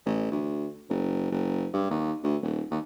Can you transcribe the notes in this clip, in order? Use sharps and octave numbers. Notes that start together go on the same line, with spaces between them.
A1
D2
F#1
F#1
G2
D#2
D2
D#1
D#2